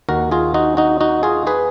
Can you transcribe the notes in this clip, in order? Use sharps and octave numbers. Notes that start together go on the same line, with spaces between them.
D#2 D#3 F#4 A#4
F4 G#4
D#4 F#4
D#4 F#4
D#4 F#4
F4 G#4
G#4 B4